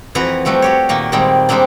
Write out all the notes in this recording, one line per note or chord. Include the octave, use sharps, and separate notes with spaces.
F2 E3 F#4 B4 A#5
F3 G3 A3 F#4
F#4 G4 C#5
A#2 D#3 A#3
A#2 D#3 G3 G#3 C4
G3 G#3 A#3 C4 D4